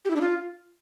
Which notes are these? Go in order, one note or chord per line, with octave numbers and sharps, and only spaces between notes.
G4
E4
D4
F4